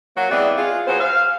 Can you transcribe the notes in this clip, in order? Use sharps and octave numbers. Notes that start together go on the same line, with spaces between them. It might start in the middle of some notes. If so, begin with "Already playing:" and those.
F#3 A#3 F#4
E3 G#3 B3 C4 D5
F4 G#4
F#3 B3 G#4 C5
F5